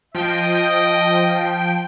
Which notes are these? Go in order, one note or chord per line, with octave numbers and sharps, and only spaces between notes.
F3 D#5 G5